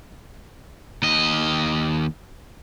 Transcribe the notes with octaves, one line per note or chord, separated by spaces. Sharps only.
D#2 D#5